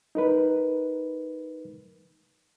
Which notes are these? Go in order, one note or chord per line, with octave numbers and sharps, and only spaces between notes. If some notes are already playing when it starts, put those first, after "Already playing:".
D#4 A#4 B4